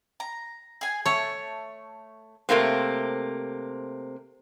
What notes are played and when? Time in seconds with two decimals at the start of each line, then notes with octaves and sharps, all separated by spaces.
0.20 A#5
0.81 G#4 G#5
1.06 A3 C#5 A5
2.49 C3 A3 A#3 C4